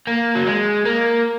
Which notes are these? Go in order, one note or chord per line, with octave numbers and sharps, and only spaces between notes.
A#3
F#3
G#3
A#3